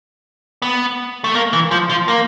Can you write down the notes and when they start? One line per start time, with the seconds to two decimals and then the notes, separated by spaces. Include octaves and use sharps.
0.62 B3
1.24 A3
1.35 A#3
1.53 E3
1.71 F3
1.90 F3
2.08 A#3